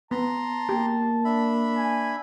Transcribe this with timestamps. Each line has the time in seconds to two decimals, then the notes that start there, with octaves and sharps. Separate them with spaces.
0.11 B3 A5 A#5 C6
0.69 A#3 G4
1.25 D4 E5 B5
1.76 G#5